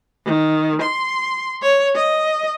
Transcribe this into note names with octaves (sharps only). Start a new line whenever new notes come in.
D#3
C6
C#5
D#5